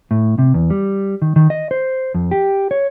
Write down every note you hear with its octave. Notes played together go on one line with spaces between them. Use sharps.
A2
C3
E2
G3
D#3
D#3
D#5
C5
F2
G4
C#5